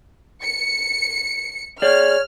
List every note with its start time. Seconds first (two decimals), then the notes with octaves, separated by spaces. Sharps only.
0.43 C#7
1.82 G#4 C#5 D5 F6